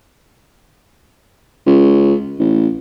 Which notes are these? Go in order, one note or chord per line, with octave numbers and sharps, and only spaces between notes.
C#2
A1